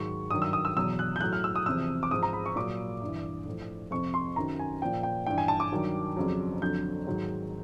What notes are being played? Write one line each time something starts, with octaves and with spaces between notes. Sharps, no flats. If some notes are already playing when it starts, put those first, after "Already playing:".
Already playing: G#2 D#3 F#3 C#6
G2 D#3 F#3 D#6
E6
D#6
E6
E2 B2 F#3 E6
F#6
G6
A2 F#3 F#6
F6
E6
D#6
E2 C3 F3 E6
D6
G#2 F3 D#6
A#5
B5
C#6
A#2 F#3 D6
G2 E3
A2 F3
F2 C3 F3 C#6
C6
F#2 D#3 F#3 A#5
G#5
A#2 F3 G5
G5
G2 E3 G5
G#5
A5
D6
G2 D#3 F#3
F2 C#3 F#3
F2 D3 F#3 G6
G#2 D#3 F#3